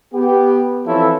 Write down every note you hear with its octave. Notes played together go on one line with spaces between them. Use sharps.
B3 G4
E3 F3 C4 E4 A4 C#5